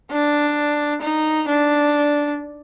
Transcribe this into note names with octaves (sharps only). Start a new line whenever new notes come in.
D4
D#4
D4